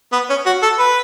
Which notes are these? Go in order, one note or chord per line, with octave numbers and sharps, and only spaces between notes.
B3
C#4
F#4
A4
B4